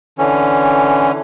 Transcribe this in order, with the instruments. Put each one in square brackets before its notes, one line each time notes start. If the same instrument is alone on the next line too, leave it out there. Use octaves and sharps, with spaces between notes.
[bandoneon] D3 E3 C#4